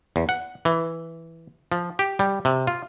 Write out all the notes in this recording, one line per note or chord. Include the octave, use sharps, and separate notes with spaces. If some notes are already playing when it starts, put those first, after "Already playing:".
E2
F#5
E3
F3
G4
G3
C3
F4